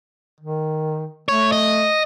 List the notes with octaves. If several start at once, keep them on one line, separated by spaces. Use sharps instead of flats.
D#3
A3 C#5
D#5